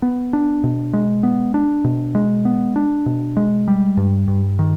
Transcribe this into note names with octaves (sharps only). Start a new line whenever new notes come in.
B3
D4
B2
G#3
B3
D4
B2
G#3
B3
D4
B2
G#3
G3
G2
G2
D#3